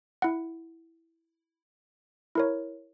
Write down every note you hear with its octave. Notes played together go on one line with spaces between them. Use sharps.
E4 F#5
E4 A#4 C#5